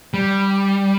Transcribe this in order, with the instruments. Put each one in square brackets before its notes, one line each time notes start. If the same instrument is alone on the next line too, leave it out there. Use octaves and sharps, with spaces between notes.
[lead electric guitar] G3